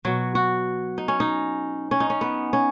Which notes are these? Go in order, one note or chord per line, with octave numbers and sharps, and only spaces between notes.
B2 F#3 F#4
F#4
D#4
C#4
D#4
C#4
D#4
C#4
B3
C#4